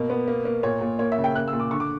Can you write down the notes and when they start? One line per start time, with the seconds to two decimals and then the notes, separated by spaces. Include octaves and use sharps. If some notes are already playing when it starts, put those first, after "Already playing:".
Already playing: B2 A#3
0.10 B3
0.28 A#3
0.45 A#3
0.63 A#2 C#5
0.81 A#2
0.99 A#3 C#5
1.12 E5
1.18 C#3
1.24 G5
1.35 A#3 F#6
1.48 E6
1.53 A#2
1.60 D6
1.71 D3 C#6
1.80 D6